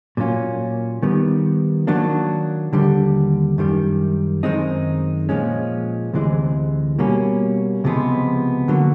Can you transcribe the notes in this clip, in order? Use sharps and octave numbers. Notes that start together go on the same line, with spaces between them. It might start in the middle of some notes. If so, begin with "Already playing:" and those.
A#2 F#3 A#3 C#4 F4
D#3 G3 B3
D#3 F#3 A#3 D4
D#2 D3 G3
F#2 D#3 G3
F#2 D#3 G#3 C4 D#4
A#2 F3 G#3 C#4
D2 C3 E3 G#3
B2 G3 A#3 C#4
C#2 C3 F3 G#3 B3
D3 F#3 A#3